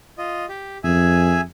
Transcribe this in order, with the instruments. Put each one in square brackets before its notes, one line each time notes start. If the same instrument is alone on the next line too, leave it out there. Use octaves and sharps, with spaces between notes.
[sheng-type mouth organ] F4 D#5
G4
[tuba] F2 [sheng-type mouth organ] G#4 E5 G#5